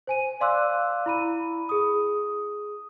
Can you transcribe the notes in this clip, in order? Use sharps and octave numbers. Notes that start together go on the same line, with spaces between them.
C5 G#5 D#7
D5 F5 C6 D6 E6 F#6
E4 B5 D#7
G#4 D#6